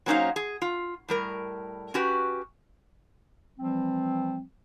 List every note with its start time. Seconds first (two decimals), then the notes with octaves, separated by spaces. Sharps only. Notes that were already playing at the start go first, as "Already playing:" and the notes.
0.06 F#3 A#3 C#4 D#4 C5 F5
0.36 G#4
0.62 F4
1.09 A2 G3 A#4
1.94 C#4 F#4 G4 B4
3.59 E3 F3 G3 C4